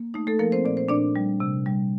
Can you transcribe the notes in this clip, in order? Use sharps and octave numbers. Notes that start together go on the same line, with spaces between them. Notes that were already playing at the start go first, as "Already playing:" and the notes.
Already playing: A#3
A3 D#4
A3 A4
F3 A#3 A#4
C4 C5
A#2 D5
C5
A#2 D4 D5
G3
C3
G3